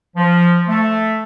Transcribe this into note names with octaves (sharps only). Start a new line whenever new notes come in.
F3
A3